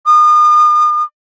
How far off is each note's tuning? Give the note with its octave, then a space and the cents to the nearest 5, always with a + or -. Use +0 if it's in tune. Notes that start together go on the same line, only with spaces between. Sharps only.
D#6 -40